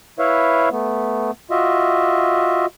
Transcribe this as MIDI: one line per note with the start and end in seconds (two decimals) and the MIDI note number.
0.19 0.69 64
0.19 0.69 71
0.19 0.69 73
0.19 0.69 76
0.19 0.69 77
0.71 1.31 57
0.71 1.31 59
1.51 2.66 65
1.51 2.66 66
1.51 2.66 75
1.51 2.66 76